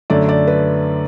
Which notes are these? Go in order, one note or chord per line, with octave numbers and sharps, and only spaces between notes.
F#2 D3 A3 D5
D5
B4